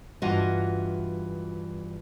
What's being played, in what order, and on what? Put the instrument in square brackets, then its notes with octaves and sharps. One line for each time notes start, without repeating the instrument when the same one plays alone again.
[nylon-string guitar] G2 E3 F4 F#4 D#5